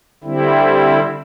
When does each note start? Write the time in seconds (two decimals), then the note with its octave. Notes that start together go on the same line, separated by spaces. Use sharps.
0.24 D3 G3 C4 E4